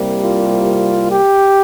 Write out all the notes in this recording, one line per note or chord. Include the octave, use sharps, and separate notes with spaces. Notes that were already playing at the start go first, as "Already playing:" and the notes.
Already playing: C2 C3 G3 A#3
F4
G4